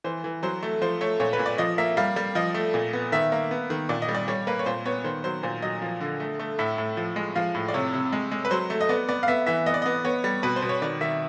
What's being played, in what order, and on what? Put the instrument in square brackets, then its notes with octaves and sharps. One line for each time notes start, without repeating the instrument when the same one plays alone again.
[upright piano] E3 C5
E3
F#3 C5
A3
F3 C5
A3 C#5
A#2 C#5
B4
A#2
D5
F3 D#5
A#3 E5
G3 F5
G3
F3 D#5
A3
A#2
B3
D#3 E5
A#3
B3
D#3
A#2 D5
D#5
G3
D5
G3 C#5
A#3 B4
C#5
A#2 C5
B3 C#5
D#3 C5
F#3 C5
A#2 C5
F#3 D#5
F3
D3
A3
A3
A2 E5
A2
F3
G#3
F3 F5
A2
D5
C3 C#5
C3
G#3
G#3
B4
F#3 C5
A3
D#5
B3 D5
B3 D5
F5
B3 E5
E3 E5
B3 D#5
D5
B3 D#5
B3 C#5
G3
B2 B4
C5
B2
C#5
D#3 D5
D#3 E5